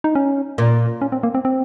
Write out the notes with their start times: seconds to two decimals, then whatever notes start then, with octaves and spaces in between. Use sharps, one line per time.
0.04 D#4
0.15 C#4
0.58 A#2
1.01 C#4
1.12 C4
1.23 A#3
1.35 C4
1.45 C4